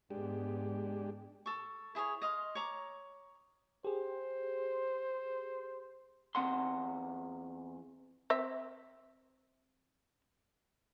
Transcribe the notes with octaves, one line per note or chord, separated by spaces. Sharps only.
G#2 G#3 B3 D4 G4
A4 C#6
E4 G#4 C5 C#5
D#5 F5 C6
C#5 A#5 D6
G4 G#4 C5
E2 C4 F#5 C6
C4 E5